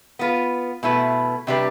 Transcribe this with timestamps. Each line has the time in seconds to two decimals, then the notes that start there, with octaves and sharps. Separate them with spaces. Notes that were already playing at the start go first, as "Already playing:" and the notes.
0.19 B3 F4 B4
0.83 B2 A3 E4 B4
1.47 C3 G3 D4 G4 B4